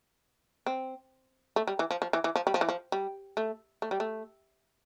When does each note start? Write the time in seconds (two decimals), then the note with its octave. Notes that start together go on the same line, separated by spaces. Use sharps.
0.66 C4
1.56 A3
1.68 G3
1.79 E3
1.91 F3
2.02 F3
2.13 E3
2.24 E3
2.36 F3
2.47 G3
2.54 F3
2.61 E3
2.69 F3
2.92 G3
3.37 A3
3.82 A3
3.91 G3
4.00 A3